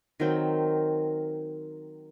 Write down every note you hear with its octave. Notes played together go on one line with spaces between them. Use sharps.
D#3 F#3 C4